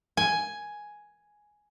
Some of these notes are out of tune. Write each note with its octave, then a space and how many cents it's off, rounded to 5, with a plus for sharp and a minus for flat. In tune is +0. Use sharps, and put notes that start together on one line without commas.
G#5 +5